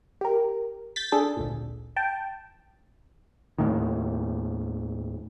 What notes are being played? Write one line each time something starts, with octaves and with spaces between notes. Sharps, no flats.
G4 A#4
G6 A6 B6
D4 G#4 A4
G#1 D2 A#2
G5 A5
D#2 A2 D#3